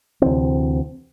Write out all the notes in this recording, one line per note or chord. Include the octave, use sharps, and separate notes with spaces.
D2 C3 E3 C4